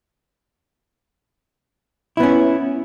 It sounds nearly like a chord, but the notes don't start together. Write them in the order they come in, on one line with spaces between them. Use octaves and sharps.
E4 B3 C#4